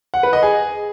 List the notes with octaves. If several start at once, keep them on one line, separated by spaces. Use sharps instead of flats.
F#5
B4
D#5
G#4